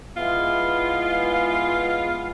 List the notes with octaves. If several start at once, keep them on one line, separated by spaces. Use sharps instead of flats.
G#3 B3 E4 F4